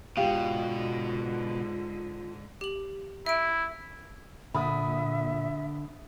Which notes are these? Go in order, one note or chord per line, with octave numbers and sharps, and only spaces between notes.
G#2 B2 D3 F4 G4 F5
G4 F#7
E4 E5 D7
A#2 D3 E5 B5 D#6